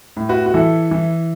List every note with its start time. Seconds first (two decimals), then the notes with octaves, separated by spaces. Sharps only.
0.17 A2
0.29 F#4 B4
0.46 F#4
0.54 E3 E4 A4
0.91 E3